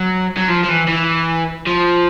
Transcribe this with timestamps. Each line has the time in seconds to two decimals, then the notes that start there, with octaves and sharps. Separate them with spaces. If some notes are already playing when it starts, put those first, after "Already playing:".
Already playing: F#3
0.37 F#3
0.49 F3
0.64 F3
0.69 E3
0.88 E3
1.67 F3